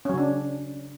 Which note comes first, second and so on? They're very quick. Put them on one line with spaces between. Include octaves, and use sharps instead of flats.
C#4 F#3 C#3 D4